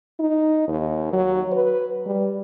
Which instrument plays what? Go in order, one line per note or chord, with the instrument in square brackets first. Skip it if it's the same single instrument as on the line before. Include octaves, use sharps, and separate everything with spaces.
[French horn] D#4
D#2
F#3
B4
G3